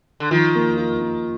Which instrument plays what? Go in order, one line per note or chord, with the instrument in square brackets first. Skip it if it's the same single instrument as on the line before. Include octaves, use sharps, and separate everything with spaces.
[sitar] D3
[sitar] D#3 [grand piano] F3
[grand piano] A#3
F4
A#3